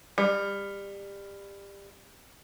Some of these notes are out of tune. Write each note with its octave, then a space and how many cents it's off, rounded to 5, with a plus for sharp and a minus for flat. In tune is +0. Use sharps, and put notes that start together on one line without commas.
G3 +25